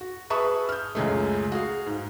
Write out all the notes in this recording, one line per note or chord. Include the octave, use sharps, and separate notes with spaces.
F#4
G#4 B4 E5 A5 C#6 D#6
F6 G6
C#2 F#2 G#3 A3
F#4 G#4 F5
G#2